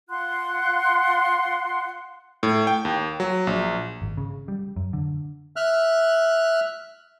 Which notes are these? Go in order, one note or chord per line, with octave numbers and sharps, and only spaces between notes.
F4 F#5 C6 F#6
A2
G5
D#2
F#3
A#1
G#1
C#3
G3
F#2
D3
E5 F6 F#6